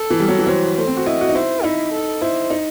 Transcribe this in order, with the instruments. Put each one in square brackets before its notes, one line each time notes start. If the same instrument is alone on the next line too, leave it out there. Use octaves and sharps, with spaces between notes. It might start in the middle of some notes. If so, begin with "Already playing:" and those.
Already playing: [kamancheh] A4
[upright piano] E3
G3
F#3
E3
[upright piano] F#3 [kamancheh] C5
[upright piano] A3 [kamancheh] C5
[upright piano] C4
F#4
[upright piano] E4 [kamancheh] D#5
[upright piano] F#4
D#4
[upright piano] E4 [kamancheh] C5
[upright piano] D#4 [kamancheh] E4
[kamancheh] A4
[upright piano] E4 [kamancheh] C5
[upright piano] D#4